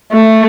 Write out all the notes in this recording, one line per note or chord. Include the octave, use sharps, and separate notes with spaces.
A3